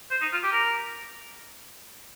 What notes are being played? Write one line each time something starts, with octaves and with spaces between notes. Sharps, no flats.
C5
D#4
F4
G4
A#4